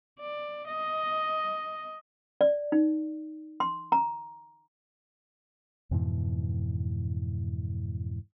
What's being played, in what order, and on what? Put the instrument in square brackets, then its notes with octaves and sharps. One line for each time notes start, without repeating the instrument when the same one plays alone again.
[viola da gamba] D5
D#5
[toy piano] D5
D#4
C6
A#5
[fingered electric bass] F2 G#2 B2 E3